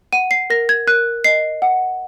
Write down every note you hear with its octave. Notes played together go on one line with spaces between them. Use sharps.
F#5 D#7
C7
A#4 A#6
G#6
A#4 F#6
D#5 C7
F#5